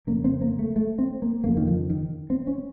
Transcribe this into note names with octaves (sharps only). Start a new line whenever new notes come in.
F2 C#3 A#3
C4
A#3
A3
A3
C4
A#3
F2 C#3 A#3
D#3
F3
D#3
C4
C#4